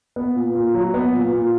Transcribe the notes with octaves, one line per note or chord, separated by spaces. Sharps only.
B3
A#2
A#2
F#3
B3
A#2
A#2